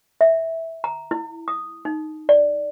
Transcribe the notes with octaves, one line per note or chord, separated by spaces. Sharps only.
E5
A#5
E4
D#6
D#4
D5